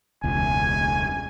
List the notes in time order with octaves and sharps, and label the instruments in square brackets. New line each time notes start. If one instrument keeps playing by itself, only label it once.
[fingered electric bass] E1 C#2 [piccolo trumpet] G#5